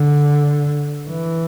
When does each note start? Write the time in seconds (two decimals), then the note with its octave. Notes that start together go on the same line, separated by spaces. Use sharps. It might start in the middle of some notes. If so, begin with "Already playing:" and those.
Already playing: D3
1.10 E3